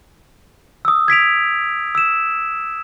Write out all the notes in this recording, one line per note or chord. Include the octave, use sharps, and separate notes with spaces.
D#6 E6
G#6 B6 D7 F7
E6 E7